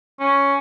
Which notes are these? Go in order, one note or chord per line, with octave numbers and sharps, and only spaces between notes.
C#4